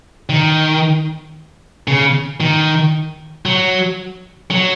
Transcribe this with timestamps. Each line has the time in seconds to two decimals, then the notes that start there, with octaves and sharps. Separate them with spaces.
0.29 D#3
1.88 C#3
2.40 D#3
3.46 F#3
4.51 F#3